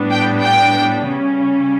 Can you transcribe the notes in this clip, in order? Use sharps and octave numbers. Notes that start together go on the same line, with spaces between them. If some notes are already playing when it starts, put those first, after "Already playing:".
Already playing: A2 G3 B3 D4
G5
G5
C#3 G3 C#4